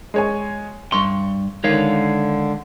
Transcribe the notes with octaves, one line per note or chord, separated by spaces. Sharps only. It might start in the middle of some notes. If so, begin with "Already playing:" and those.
G#3 C#5 G#5
G2 C6 C#6
D3 D#3 G#3 C#5 F5